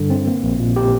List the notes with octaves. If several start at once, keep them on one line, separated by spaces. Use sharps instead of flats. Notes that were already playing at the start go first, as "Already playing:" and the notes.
Already playing: G2 D3 G3
C4
A#3
A#1
A#2
G4